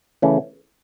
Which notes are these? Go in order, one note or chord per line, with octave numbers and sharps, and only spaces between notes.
C#3 E3 A3 C#4